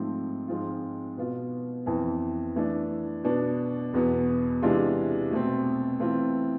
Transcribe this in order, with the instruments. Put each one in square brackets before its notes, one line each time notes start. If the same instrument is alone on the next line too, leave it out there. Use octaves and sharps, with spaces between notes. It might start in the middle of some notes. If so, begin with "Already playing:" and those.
Already playing: [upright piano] G#2 F3 A3 C4
G#2 F3 G#3 C4 F4
B2 B3 F4
F2 E3 B3
E3 A3 D4
B2 B3 D4
E2 B2 B3
C3 E3 G#3 D4 F4
B2 A3 C4
E3 A3 C4 F4